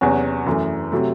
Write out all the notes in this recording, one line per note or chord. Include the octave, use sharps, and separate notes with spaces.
E2 C3 F#3 C#4 F#4
F#2 E3 A3
C3 F#3 A3